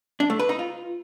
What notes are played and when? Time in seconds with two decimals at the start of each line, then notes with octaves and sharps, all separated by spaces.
0.20 D4
0.30 A3
0.39 B4
0.49 D#4
0.59 F4